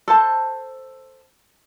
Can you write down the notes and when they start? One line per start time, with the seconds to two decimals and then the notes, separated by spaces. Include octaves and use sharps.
0.08 A4 C5 A5